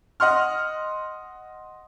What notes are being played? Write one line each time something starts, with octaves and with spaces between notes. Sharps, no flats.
D#5 F#5 C6 F6